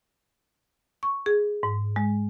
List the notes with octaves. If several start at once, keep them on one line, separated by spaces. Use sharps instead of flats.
C#6
G#4
G#2
G#3